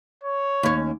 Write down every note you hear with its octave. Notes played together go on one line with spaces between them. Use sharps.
C#5
D#2 C#4